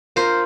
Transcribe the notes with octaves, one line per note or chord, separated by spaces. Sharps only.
F4 A#4 C5